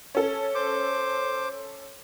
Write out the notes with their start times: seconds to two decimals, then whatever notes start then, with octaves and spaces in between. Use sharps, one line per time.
0.15 C#4 A4
0.55 C5 D6